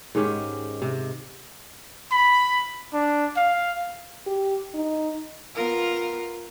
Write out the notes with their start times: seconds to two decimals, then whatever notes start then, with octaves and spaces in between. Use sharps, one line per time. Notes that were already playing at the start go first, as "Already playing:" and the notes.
0.15 G#2 D#3 C#4 G4
0.82 C3
2.12 B5
2.93 D4
3.37 F5
4.26 G4
4.74 D#4
5.55 B3 F4 A#4